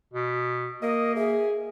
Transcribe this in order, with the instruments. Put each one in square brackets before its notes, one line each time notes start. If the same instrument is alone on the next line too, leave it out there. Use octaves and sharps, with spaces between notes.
[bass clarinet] B2
[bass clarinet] A#3 [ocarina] A#4 [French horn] D#5
[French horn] G#4 [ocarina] E5